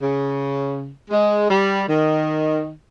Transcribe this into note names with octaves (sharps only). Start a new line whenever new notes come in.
C#3
G#3
G3
D#3